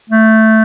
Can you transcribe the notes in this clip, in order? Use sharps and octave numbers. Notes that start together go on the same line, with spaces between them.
A3